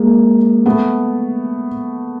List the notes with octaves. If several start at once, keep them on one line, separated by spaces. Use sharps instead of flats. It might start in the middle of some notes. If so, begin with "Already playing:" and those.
Already playing: G#3 A#3
A3 B3